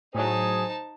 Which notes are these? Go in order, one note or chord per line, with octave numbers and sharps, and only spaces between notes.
A2 F#3 D#4 G#4 C5 A5